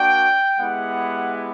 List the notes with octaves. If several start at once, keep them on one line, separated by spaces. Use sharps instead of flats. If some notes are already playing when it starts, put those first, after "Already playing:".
Already playing: A#3 D4 F#4 G5
G#3 B3 E4 G4 F#5